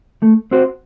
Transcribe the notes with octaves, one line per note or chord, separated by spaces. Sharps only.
A3
C4 F#4 C5